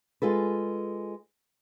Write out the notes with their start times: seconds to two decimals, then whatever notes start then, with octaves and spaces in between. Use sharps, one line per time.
0.22 G#3 F4 A4 B4